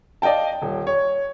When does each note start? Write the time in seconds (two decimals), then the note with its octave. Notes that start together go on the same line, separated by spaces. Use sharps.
0.22 D5 D#5 F5 G5 A5
0.62 D#1
0.87 C#5